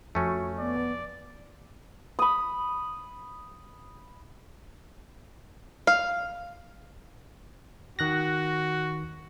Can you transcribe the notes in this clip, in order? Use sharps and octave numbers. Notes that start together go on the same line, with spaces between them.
F2 A3 C#4 F#4
B3 D5
B5 D#6
F5
D#3 F#4 F#6 A#6